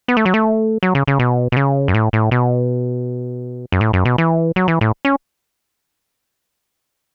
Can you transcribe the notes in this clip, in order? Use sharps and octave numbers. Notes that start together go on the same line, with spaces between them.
B3
A3
F#3
A3
F#3
C#3
C#3
B2
B2
C#3
F#2
A2
A2
B2
F#2
A2
F#2
B2
E3
F#3
E3
A2
C#4